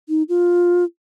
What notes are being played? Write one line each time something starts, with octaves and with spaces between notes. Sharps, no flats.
D#4
F4